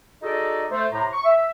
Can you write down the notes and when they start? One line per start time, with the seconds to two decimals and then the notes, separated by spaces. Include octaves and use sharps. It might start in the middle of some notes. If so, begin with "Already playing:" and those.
0.22 D#4 F#4 G#4 A4 D5 D#5
0.71 A3 A4 C5
0.92 A2 C3 C5 A#5
1.13 C#6
1.25 E5